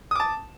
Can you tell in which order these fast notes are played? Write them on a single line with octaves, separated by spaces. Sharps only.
D#6 D6 A5